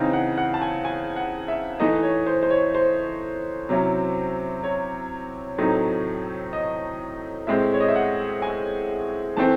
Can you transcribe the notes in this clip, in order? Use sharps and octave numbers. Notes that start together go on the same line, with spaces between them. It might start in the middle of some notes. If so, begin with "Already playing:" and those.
Already playing: C#3 E3 C4 D#4
F#5
F#5
A5
G#5
G#5
F#5
E5
E3 A3 D#4 D#5
C#5
C5
C5
C#5
C5
C3 F#3 C#4 E4
C#5
A2 F#3 A3 C4 D#4
D#5
A2 G#3 C4 E5
C#5
D#5
E5
F#5
G#5
E3 A3 C4 A5